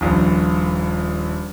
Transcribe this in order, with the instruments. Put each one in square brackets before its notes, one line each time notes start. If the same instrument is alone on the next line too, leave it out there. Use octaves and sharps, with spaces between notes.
[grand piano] D#1 A#1